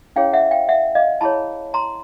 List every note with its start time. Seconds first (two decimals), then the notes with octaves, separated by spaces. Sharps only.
0.16 C#4 E4 G#4 C#5 F5 G5
0.33 E5 F#5
0.51 F5 G5
0.69 E5 F#5
0.95 D#5 F5
1.21 E4 G#4 C#5 A5 B5
1.74 A#5 C6